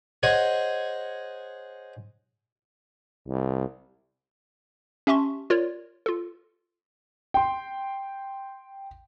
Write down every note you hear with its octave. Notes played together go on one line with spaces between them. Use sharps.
G#4 C5 C#5 D#5 F#5 G#5
C2
C#4 G4 E5 A5 C6 C#6
F4 A#4 C#5 D5
F4 A4
G5 C6